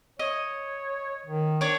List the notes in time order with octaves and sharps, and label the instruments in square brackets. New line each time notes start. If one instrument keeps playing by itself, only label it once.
[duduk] C#5 [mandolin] D#5
[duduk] D#3
[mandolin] D4 C#5